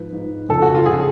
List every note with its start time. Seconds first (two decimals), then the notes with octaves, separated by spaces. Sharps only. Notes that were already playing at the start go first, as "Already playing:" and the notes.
Already playing: G#2 F3 B4
0.12 G#2 F3
0.49 F2 C#3 F3 A4
0.62 F#4
0.75 F4
0.86 C#3 F3 G#4